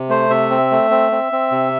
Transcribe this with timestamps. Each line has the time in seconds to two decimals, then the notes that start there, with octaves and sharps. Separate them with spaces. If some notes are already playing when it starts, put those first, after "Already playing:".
Already playing: C3
0.09 A3 C5
0.30 C3 E5
0.51 C4
0.71 A3
0.91 C4
1.12 C4
1.32 C4
1.52 C3